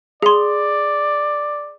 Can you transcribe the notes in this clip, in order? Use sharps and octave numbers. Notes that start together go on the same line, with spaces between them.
G#4 D5 C6